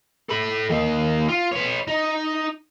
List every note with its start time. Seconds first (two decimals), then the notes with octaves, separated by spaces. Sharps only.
0.30 A4 B5
0.70 D#3 A#3
1.28 F4
1.52 B4 C#5
1.88 D#4